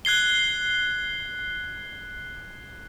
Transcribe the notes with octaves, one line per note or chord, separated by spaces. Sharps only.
F#6 G#6 C7 G7